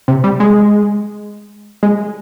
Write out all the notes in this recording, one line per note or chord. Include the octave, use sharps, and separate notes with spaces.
C3
G3
G#3
G#3